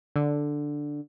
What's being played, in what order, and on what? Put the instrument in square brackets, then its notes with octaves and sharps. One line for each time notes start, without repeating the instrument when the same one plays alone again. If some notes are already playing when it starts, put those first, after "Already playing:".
[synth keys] D3